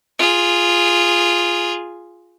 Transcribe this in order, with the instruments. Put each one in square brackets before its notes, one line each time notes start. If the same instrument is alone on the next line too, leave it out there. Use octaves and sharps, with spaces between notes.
[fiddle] F4 G#4